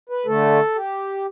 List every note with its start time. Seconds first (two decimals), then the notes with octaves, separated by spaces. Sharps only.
0.09 B4
0.26 D3 A3 A4
0.75 G4